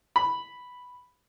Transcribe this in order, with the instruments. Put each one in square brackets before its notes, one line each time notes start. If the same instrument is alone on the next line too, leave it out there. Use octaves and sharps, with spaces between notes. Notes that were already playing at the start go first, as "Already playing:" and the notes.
[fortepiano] B5